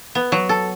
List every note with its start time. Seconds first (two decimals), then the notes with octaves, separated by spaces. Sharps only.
0.15 B3
0.32 F#3
0.49 A4